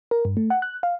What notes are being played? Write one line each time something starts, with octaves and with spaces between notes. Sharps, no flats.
A#4
G2
A3
F#5
F#6
F5